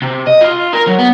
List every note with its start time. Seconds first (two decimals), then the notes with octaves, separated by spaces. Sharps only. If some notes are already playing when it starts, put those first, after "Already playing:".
0.02 C3
0.27 D#5
0.41 F4
0.73 A#4
0.87 F#3
0.99 B3